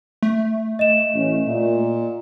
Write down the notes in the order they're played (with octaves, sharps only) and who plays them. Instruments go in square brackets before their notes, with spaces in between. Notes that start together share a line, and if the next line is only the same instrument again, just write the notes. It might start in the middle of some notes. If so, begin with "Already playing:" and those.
[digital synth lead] A3
[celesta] D#5 E7
[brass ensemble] A1 C#4
A#2